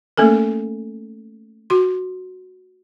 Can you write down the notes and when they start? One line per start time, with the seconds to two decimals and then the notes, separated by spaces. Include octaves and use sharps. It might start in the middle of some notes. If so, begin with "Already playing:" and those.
0.17 A3 A#3 C#4 A4 A#4
1.70 F#4 C6